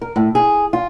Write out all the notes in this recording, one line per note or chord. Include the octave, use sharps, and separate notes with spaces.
A#4
A2
G#4
F4